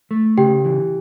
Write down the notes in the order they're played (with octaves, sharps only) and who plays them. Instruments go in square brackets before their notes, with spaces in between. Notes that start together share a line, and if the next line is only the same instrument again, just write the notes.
[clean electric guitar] A3
[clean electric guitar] C#3 [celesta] G4 G5
[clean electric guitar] E3